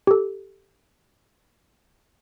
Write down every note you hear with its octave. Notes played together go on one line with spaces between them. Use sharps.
G4 A4